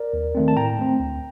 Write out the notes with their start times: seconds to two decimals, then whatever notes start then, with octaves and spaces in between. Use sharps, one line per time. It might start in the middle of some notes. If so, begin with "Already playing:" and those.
Already playing: A#4 D5
0.13 D#2
0.35 D#3 A3 C4
0.48 A5
0.56 A2 G5 A#5
0.79 A3 C4
1.00 D2